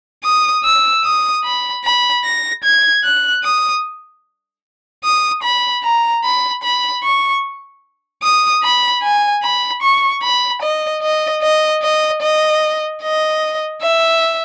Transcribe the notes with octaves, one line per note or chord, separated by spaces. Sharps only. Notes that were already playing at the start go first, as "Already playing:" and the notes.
D#6
E6
D#6
B5
B5
A#6
G#6
F#6
D#6
D#6
B5
A#5
B5
B5
C#6
D#6
B5
G#5
B5
C#6
B5
D#5
D#5
D#5
D#5
D#5
D#5
E5